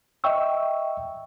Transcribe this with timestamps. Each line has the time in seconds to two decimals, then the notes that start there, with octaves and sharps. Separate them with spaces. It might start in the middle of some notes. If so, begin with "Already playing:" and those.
0.24 D#5 E5 G5 C#6 E6